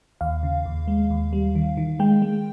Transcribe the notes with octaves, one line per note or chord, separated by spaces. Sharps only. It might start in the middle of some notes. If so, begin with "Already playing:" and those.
D#2 F5
C#3
D#2
G#3
D#2
G3
D#3
D#3
G#3 G5
G#3